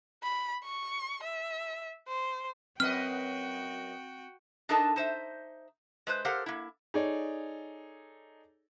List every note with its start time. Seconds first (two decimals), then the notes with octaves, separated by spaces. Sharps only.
0.23 B5
0.64 C#6
1.23 E5
2.08 C5
2.80 F#2 C4 F#4 B4 D#5 G5 F6
4.69 D4 D#4 A4 A#4 D#5 A5
4.96 D#4 C5 E5
6.07 G#3 B4 C5
6.25 G4 A4 A#4 C5 F5 F#5
6.46 A#3 E4
6.94 D#4 G#4 A4 C#5 D5